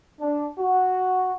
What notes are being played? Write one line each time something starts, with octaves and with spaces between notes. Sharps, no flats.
D4
F#4